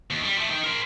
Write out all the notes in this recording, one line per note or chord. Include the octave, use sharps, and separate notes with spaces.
D#2
G3
F3 A3
D#4 G5
A#4 C5